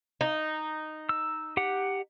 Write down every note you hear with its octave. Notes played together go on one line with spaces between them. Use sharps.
D#4
E6
G4 F#5